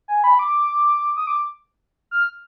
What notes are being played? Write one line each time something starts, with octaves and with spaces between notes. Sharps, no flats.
G#5
B5
D6
D#6
D6
F6